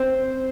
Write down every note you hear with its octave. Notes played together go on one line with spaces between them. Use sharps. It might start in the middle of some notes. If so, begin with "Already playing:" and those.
Already playing: C4 C5